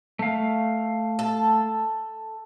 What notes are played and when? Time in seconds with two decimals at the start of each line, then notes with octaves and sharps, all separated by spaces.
0.19 A3 F5
1.19 A4